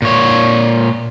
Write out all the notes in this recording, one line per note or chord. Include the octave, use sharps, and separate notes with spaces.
A#2 C#5